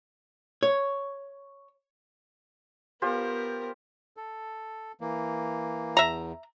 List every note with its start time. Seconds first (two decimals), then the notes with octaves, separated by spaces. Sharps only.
0.63 C#5
3.02 B3 F4 G4 A#4 C5
4.17 A4
5.01 E3 A#3
5.97 E2 E5 A#5